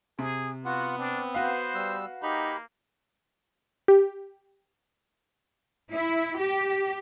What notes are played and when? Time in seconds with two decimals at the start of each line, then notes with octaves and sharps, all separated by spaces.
0.19 C3 G#4
0.65 B3 F4 F#4 F#5
0.98 C4 D4
1.34 F#4 B4 C5 F5
1.75 G3 E6
2.23 A#3 D#4 G4 B5
3.88 G4
5.92 E4
6.39 G4